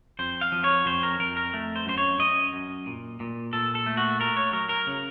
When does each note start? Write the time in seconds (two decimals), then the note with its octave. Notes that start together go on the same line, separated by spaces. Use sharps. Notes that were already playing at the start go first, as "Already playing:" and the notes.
0.19 F2 C5
0.41 F5
0.52 F3
0.64 C#5
0.86 F2 C5
1.03 A#4
1.19 F2 A#4
1.37 A#4
1.53 A3
1.76 C5
1.86 F#2 C5
1.98 C#5
2.19 F#2 D#5
2.53 F#2
2.86 A#2
3.20 A#2
3.53 A#2 A4
3.75 A4
3.86 A3
3.97 F#4
4.20 A3 A#4
4.37 C#5
4.53 F#3 A#4
4.69 A#4
4.87 C#3